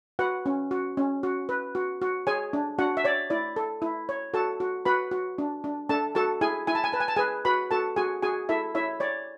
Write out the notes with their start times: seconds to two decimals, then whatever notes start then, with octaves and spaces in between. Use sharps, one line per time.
0.19 F#4 B4 F#5
0.46 C#4
0.71 F#4
0.97 C#4
1.23 F#4
1.49 B4
1.75 F#4
2.02 F#4
2.27 G#4 C#5 G#5
2.53 D4
2.79 D4 F#4 F#5
2.97 E5
3.04 C#5 D5
3.30 E4 D5
3.56 A4
3.82 E4
4.09 C#5
4.34 F#4 A4 A5
4.60 F#4
4.85 F#4 B4 B5
5.11 F#4
5.38 D4
5.64 D4
5.89 D4 A4 A5
6.15 F#4 A4 A5
6.41 E4 G#4 G#5
6.67 E4 G#5
6.75 A5
6.84 G#5
6.92 B4 A5
7.00 G#5
7.08 A5
7.16 G#4 B4 G#5
7.45 F#4 B4 B5
7.71 F#4 A4 A5
7.96 F#4 G#4 G#5
8.22 F#4 G#4 G#5
8.49 E4 A4 E5
8.75 E4 C#5 E5
9.00 C#5 D5